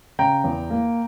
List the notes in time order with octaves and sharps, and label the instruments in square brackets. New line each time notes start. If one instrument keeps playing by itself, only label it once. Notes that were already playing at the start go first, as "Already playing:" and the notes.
[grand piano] C#3 G5 A#5
E2
A#3